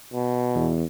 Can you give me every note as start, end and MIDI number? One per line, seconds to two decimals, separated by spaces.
0.13 0.76 47
0.55 0.84 40